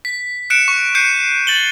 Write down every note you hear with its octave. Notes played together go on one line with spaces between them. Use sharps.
B6
F#6 C#7 D7 E7
C#6
F#6 G6 C7 C#7 D#7
A6 F#7 G7